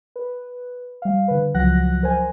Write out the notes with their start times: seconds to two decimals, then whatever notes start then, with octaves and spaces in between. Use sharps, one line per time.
0.16 B4
1.02 G3 F5
1.28 D3 B4
1.42 D3
1.54 C#2 F3 F#3 F#5 F#6 A#6
2.03 A#4 C5 G#5